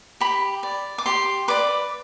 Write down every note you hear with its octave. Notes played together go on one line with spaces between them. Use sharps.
G4 B5
D5
D6
G4 C6
B4 D5 D6